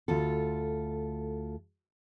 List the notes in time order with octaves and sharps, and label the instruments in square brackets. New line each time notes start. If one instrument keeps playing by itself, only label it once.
[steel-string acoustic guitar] D2 F4 A4